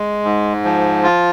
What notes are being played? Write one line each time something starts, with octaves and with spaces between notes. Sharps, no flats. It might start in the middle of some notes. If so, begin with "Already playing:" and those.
Already playing: G#3
G#2
F3
F4